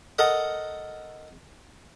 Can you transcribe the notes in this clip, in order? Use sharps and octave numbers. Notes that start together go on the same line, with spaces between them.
A4 A#4 D#5 F#5